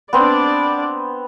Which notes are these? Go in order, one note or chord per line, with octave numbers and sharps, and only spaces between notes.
B3 C4 D4 D5